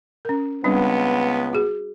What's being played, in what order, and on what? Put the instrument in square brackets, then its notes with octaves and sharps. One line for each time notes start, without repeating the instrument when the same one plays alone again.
[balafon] C#4 A#4
[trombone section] C#2 B3 [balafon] G3 C4 D4
[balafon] F#4 G#4